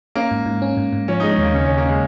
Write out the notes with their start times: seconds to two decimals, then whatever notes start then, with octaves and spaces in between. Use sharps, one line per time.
0.15 A#3 C#4
0.31 G#2
0.46 G#2
0.62 C#4
0.77 G#2
0.93 G#2
1.08 F3 C#4
1.20 G#3 D#4
1.31 C#4
1.38 D#2 A#3
1.54 C#3 C#4
1.66 D#2 C#4
1.78 A#3
1.86 C#3 G#3